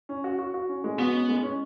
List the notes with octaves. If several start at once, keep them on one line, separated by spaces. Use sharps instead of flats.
C#4
F#4
F#4
F#4
C#4
G#3
B3 F#4
C#4
G#3
C#4